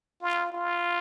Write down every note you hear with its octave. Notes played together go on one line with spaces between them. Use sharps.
F4
F4